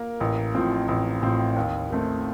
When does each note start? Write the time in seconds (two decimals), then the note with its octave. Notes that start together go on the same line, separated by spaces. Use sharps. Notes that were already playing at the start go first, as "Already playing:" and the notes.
Already playing: A#3 A#4
0.20 A1
0.55 A2 F3 C4
0.88 A1
1.22 A2 F3 C4
1.56 D#2
1.90 D#3 A3 C4